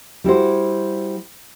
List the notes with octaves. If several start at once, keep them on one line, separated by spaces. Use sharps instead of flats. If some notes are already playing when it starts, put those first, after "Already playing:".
G3 E4 F#4 C5